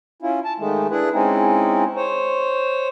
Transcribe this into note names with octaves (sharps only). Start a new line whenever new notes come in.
C#4 E4 F4
A5
D#3 G#3 A3
D4 E4 G#4 B4
G#3 C4 C#4 D#4 E4
C5 C#5